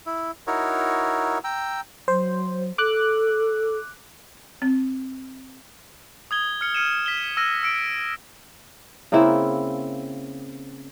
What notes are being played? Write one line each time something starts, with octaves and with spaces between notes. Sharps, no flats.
E4
D#4 E4 F#4 A#4 C#5
G5 A#5 E6
F#3 C5
A4 D6 F#6
C4
D#6 G#6 G7
F6 C#7 G7
F6 C#7 D#7 E7
B6 E7 G7
E6 F6 A#6 D#7
E6 C#7 D7
C#3 A#3 C4 E4